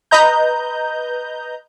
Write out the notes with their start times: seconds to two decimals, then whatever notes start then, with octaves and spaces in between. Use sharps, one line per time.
0.11 B4 D#5 A#5 G6